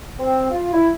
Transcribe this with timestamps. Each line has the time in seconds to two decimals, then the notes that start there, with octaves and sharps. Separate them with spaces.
0.18 C4
0.50 F4
0.72 E4